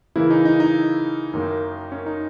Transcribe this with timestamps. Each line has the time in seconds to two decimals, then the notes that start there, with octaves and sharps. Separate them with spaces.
0.16 C#3 E3 A#3 E4
0.30 D#4
0.45 D#4
0.60 D#4
1.33 F#2 D#3 A#3
1.92 C#4
2.06 D#4